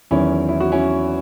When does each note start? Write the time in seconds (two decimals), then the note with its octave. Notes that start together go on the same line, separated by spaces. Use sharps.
0.11 E2 D#3 F#3 C#4 E4
0.49 E4
0.60 F#4
0.72 C#4 E4